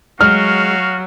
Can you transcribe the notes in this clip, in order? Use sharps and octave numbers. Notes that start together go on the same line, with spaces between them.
F#3 G#3 F#4 F5 F6